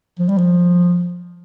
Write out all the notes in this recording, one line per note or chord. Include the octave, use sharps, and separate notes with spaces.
F3
G3
F3